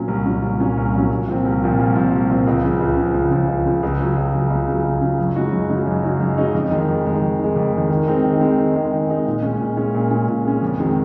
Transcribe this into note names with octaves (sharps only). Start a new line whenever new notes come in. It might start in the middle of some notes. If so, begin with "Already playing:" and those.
Already playing: A#2 F#3 C#4
C2
A#2 F#3 C#4
C2
A#2 F#3 C#4
C2
A#2 F#3 C#4
C2
A#2 F3 C4
C2
A#2 F3 C4
C2
A#2 F3 C4
C2
A#2 F3 C4
C#2
C#3 F3
C#2
C#3 F3
C#2
C#3 F3
C#2
C#3 F3
C#2
C#3 F#3
C#2
C#3 F#3
C#2
C#3 F#3
C#2
C#3 F#3
F#2
C#3 G#3 D#4 F#4
F#2
C#3 G#3 D#4 F#4
F#2
C#3 G#3 D#4 F#4
F#2
C#3 G#3 D#4 F#4
F2
D#3 G#3
F2
D#3 G#3
F2
D#3 G#3
F2
D#3 G#3
D#3
G#3 C4 D#4
D#3
G#3 C4 D#4
D#3
G#3 C4 D#4
D#3
G#3 C4 D#4
A#2
G#3 C#4
A#2
G#3 C#4
A#2
G#3 C#4
A#2
G#3 C#4
F2
D#3 G#3 C4 F#4